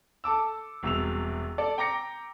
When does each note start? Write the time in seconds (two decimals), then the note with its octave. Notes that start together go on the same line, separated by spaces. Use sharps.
0.24 A4 A5 D6 E6
0.83 E1 C2 E6 F7
1.58 A4 D5
1.78 G5 A#5 D6 A#6 C#7